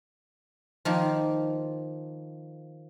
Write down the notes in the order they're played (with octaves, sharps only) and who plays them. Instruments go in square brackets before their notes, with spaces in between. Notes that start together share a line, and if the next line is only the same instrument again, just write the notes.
[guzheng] D#3 F3 A#3